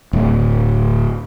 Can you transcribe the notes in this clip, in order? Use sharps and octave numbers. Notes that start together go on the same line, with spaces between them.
D1